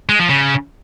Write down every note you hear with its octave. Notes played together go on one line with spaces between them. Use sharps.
G#3
F3
C#3